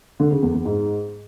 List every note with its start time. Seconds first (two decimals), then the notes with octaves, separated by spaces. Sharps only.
0.20 D3
0.31 C#3
0.43 E2
0.54 E2
0.65 G#2